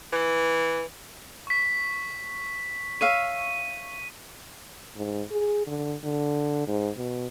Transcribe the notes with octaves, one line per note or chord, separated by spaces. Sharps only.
E3
C#6 B6
C#5 E5 F5 D#7
G#2
G#4
D3
D3
G#2
B2